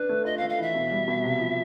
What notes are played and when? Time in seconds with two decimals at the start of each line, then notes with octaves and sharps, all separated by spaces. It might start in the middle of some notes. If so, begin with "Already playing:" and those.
Already playing: D4 B4
0.09 A3
0.25 F4 D#5
0.38 F5
0.41 A3
0.49 F5
0.58 E3 E5
0.74 B2
0.91 G3
1.08 B2
1.24 C3
1.40 F3